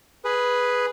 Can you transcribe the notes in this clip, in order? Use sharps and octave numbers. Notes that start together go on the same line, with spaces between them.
G#4 B4